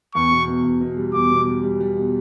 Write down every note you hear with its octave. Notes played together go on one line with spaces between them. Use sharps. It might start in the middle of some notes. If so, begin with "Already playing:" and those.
E2 C#6
B2
B2
E2
B2
G3
E2 D6
B2
G3
G3
G3
B2